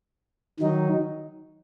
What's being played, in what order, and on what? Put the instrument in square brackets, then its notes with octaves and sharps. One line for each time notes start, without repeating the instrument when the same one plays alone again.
[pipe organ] D#3 F#3 D#4